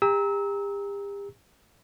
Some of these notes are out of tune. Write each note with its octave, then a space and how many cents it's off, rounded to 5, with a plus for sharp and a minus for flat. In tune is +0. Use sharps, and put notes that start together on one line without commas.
G4 +40 A#5 +0 E6 -30